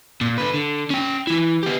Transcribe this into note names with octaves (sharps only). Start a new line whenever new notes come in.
A#2
D3 B4
D3
C#4 G5
E3 E4
B3 G4